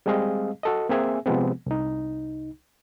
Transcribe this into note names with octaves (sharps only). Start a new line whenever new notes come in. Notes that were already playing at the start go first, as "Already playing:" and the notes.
G3 G#3 C4 G#4 D#5 F5
F#4 A4 D#5
A#3 C4 G#4 E5 G#5
C3 F3 G#3 B3 C4
C2 D#4